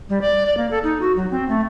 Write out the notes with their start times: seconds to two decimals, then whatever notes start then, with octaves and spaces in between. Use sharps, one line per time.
0.10 G3
0.21 D5
0.46 D5
0.57 A#3
0.71 A4
0.84 D#4
1.01 F#4
1.16 F#3
1.31 C4
1.49 A3